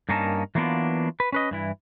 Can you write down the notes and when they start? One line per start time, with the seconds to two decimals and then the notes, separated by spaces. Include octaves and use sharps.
0.09 G2 A#3 C#4 D#4 A#4 A5
0.55 E3 F#3 A#3 B3 D4 F4
1.20 B4
1.32 C#4 B4 D#5
1.51 G2 E3 E4